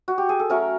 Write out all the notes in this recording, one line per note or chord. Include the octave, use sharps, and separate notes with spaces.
F#4
G4
G#4
A4
F#3 A3 C#4 A#4